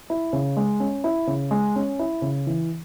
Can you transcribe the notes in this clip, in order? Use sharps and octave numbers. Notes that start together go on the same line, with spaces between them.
E4
C#3
G#3
C#4
E4
C#3
G#3
C#4
E4
C#3
E3